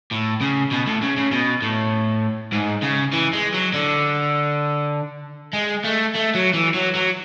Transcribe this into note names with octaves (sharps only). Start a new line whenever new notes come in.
A2
C#3
B2
A2
C#3
C#3
B2
A2
G#2
C#3
E3
G#3
F#3
D3
G#3
A3
A3
F#3
E3
F#3
F#3